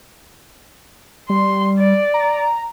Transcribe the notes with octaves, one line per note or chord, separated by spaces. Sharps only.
G3 C6
D5
A#5